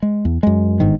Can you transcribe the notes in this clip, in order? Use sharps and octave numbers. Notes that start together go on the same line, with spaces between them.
G#3
E2
F#2 G#3
G1 G#2 D#3